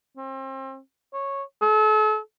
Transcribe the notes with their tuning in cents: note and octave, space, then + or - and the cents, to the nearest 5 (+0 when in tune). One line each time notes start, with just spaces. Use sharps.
C4 +35
C#5 -10
A4 -40